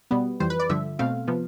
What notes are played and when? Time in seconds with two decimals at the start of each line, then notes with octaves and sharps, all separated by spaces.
0.11 B2 G3 B3
0.40 F2 E3 G3 C5
0.50 B4
0.59 D5
0.69 G2 D3 F3 E5
0.99 B2 A3 C4 F5
1.28 C3 F3 B3